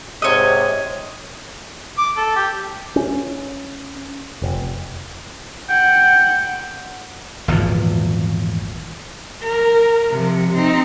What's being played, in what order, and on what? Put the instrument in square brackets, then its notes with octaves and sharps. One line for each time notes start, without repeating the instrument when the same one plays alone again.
[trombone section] G#2 C3 [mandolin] C#5 D#5
[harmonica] D6
A4
G4
[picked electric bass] C#4
F1
[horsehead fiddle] F#5 [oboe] G5
[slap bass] G#1 E2 A#2 F3
[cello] A#4
C3 F3
C4 D#4